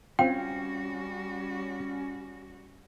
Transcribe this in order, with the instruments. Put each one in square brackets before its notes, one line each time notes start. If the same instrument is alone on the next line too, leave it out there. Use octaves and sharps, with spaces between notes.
[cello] G3 F#4 [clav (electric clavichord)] C4 F4 [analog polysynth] C#4 [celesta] G5